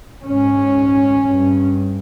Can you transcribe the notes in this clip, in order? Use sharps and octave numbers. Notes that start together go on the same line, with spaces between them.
G#2 C#4
G2